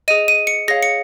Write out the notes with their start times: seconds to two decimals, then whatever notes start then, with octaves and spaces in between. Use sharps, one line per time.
0.08 G#4 D#5 D#7
0.28 D#7
0.47 C#7
0.68 G#4 C#5 F5 A#6
0.83 C#7